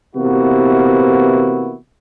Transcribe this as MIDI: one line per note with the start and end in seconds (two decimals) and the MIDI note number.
0.15 1.75 48
0.15 1.75 52
0.15 1.75 58
0.15 1.75 59
0.15 1.75 64
0.15 1.75 66